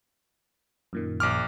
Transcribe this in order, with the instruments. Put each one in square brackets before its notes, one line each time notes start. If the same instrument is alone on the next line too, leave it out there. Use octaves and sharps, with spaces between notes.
[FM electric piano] F#2 A#2 D#3
[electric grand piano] A#1 D6 F6